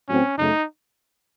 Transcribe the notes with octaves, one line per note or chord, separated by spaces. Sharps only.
A2 F#3 C4 C#4
F#2 C#3 A3 D#4